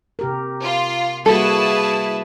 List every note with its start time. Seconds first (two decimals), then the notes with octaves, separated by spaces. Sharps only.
0.19 C3 G4 A#4
0.62 F4
1.26 G3 A#3 E4 F#4 G#4 A4 B4 A5